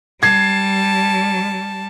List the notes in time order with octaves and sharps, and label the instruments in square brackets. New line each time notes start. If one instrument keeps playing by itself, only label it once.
[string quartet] G3 [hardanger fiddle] A5 [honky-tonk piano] G#6 C7